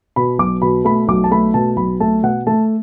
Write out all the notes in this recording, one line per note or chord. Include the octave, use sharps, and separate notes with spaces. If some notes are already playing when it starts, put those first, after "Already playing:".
B2 B5
B1 D6
B2 B5
A3 B5
B1 D6
A5
A3 B5
B2 A5
B1 B5
A3 A5
B2 F#5
A3 A5